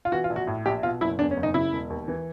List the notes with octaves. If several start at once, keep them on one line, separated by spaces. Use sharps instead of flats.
F4
E3 F#4
F4
A#1
F#4
A2
A#1 G4
B2 F4
F#1 E4
E2 D4
C#4
F#1
D#4
C#3 E4
E1
D#2
E3